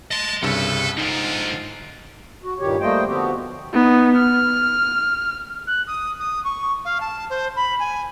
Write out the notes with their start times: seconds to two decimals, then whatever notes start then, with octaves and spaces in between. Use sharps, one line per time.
0.11 D#5 A5 C6
0.42 C2 G2 C#3 A4 B4
0.97 G#2 D3 D#4 F4
2.43 F#4
2.59 G2 A#2 D#3 G4 C#5
2.81 G3 A3 A#3 C5 D#5 G5
3.07 D3 F3 B3 C4 F#4 G4
3.73 B3 D#4
4.17 F6
5.67 F#6
5.87 D#6
6.20 D#6
6.44 C#6
6.85 F5
7.00 A5
7.30 C5
7.56 B5
7.79 G#5